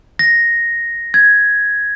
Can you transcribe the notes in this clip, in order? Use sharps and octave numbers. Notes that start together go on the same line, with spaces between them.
A#6
G#6